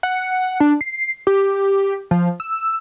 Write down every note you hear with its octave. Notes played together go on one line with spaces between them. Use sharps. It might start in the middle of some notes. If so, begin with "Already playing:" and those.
F#5
D4
C7
G4
F3
E6